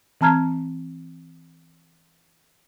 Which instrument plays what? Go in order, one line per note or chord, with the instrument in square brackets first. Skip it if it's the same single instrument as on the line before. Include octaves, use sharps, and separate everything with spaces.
[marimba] E3 C4 A5 A#5 F6 G#6